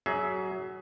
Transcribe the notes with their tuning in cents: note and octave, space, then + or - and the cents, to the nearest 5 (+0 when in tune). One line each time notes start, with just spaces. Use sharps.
F#3 +25 G#4 +20 E5 -5